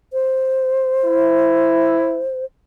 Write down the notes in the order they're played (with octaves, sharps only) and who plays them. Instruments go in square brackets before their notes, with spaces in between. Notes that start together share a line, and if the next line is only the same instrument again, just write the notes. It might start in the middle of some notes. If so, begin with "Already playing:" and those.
[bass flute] C5
[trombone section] E4